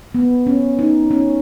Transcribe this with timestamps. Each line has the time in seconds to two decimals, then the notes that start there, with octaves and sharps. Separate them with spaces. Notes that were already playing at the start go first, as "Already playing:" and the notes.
0.15 B3
0.47 C#4
0.79 D#4
1.11 C#4